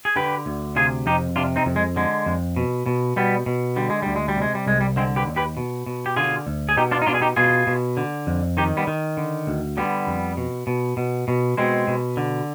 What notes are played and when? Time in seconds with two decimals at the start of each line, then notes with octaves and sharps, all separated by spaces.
0.05 G#4
0.16 D3 G4 B4
0.46 D2
0.76 C3 F4 G#4
1.06 F2 D#4 G4
1.36 C3 D4 F4
1.56 C4 D#4
1.66 F2
1.76 G#3
1.96 D3 G#3
2.26 F2
2.56 B2
2.86 B2
3.16 B2 G3 B3
3.46 B2
3.76 D3 G3
3.90 G#3
4.02 D2 G3
4.16 G#3
4.28 G3
4.37 C3
4.42 G#3
4.55 G3
4.66 C2 G#3
4.81 G3
4.96 D3 G#3 C4
5.16 G4 B4
5.26 D#2
5.36 G4 B4
5.57 B2
5.86 B2
6.06 G4
6.16 D3 F4 G#4
6.47 D2
6.69 G#4
6.77 B2 D#4 G4
6.91 D4 F4
7.02 D#4
7.06 B2 D4 F4
7.14 G#4
7.22 D#4 G4
7.36 B2 F4 G#4
7.67 B2
7.97 D3
8.27 F2
8.57 D#3 D#4 G4
8.77 G3 B3
8.87 D#3
9.17 D3
9.47 D2
9.77 D3 G3 B3
10.07 F2
10.37 B2
10.67 B2
10.97 B2
11.28 B2
11.57 B2 G#3 C4
11.88 B2
12.17 D3